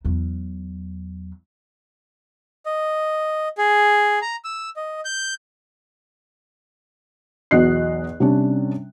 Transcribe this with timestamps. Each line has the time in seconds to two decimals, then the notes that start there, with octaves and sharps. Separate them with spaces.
0.05 E2 F#3
2.66 D#5
3.58 G#4
4.22 A#5
4.45 E6
4.76 D#5
5.05 G6
7.51 B1 E2 F#4 D#5 F#6 C7
8.20 C3 G3 C#4 D4